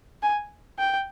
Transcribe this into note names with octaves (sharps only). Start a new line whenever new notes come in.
G#5
G5